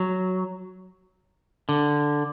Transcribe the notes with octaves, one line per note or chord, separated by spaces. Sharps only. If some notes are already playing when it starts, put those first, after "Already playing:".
Already playing: F#3
D3